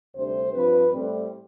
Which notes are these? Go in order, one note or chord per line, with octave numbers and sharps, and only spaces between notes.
D2 C3 G3 D4 C5
G2 F3 C4 B4
A2 G3 C4